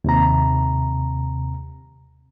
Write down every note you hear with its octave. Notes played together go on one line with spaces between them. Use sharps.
D#2 C3 A#5